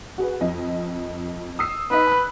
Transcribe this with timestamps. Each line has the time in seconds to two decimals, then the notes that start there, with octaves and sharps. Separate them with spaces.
0.18 F#4 G#4 B4
0.41 F2 D#5
1.59 D#6 E6 C7
1.91 D#4 B4 D#5 B6
2.07 B5 F#6